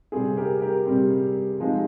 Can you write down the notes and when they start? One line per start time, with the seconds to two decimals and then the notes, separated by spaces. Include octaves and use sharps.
0.12 C3 G3 C4 G#4
0.37 G4 A#4
0.62 G4 A#4
0.86 C3 G3 C4
1.60 F3 G#3 C4 D#4